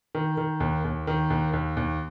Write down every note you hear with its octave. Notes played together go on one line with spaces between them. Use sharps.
D#3
D#3
D#2
D#2
D#3
D#2
D#2
D#2